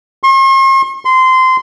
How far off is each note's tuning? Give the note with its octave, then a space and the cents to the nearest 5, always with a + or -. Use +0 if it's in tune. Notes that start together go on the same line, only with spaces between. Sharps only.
C6 +45
C6 -20